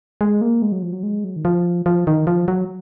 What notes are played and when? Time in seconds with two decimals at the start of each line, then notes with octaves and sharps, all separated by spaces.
0.21 G#3
0.41 A#3
0.62 G#3
0.72 F#3
0.82 F3
0.93 F#3
1.03 G#3
1.24 F#3
1.36 D#3
1.45 F3
1.86 F3
2.07 D#3
2.27 F3
2.48 F#3